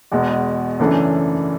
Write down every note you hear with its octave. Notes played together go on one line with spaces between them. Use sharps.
E2 B2 G#3
F#2 C#3 E3 A3 D4